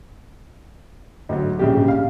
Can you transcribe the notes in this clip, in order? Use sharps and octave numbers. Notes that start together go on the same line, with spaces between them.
D2 F#3
A#1 C#3 G3 G4
F5